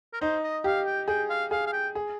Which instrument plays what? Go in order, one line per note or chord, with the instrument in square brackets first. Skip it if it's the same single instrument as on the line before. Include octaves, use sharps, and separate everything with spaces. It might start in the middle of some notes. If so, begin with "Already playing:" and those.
[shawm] A#4
[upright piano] D#4 [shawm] C5
[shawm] D#5
[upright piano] G4 [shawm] F5
[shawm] G5
[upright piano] G#4 [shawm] G5
[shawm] F5
[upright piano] G#4 [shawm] F5
[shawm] F5
G5
[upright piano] G#4